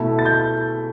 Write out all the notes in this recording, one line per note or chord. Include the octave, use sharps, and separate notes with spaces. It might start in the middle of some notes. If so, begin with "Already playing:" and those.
Already playing: B2 A3 E4
A6
G6